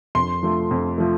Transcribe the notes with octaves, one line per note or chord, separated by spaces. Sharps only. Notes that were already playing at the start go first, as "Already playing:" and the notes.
F2 C6
F3 A3
F2
F3 A3